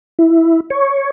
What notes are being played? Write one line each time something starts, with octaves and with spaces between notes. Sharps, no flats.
E4
C#5